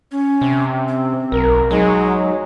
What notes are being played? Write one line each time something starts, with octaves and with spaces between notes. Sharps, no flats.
C#4
C3
C4
B1 A#4
F#3 G#3 D#4